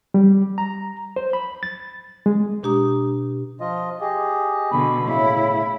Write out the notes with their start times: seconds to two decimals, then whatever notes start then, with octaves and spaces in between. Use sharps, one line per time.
0.14 G3
0.58 A#5
1.16 C5
1.33 B5
1.63 A6
2.26 G#3
2.63 B2 D4 G4 A#5 D#6
3.60 F3 F4 D#5
4.00 G4 G#4 D#5
4.71 B2 D3 B5
5.07 A2 C#3 E4